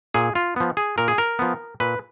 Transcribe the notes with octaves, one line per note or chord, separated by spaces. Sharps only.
A#2 G#4
F4
F3 B3
G#4
A#2 A#4
G#4
A#4
F3 B3
A#2 B4